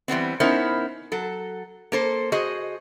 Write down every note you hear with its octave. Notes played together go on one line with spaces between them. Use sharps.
E3 G3 B3 C4
B3 C#4 D#4 E4 A#4 C5
F#3 A4
A#3 A4 C5
F#4 G#4 C5 D#5